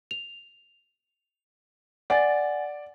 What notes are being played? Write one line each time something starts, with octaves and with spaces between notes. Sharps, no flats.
F7
D5 F#5 G#5 A6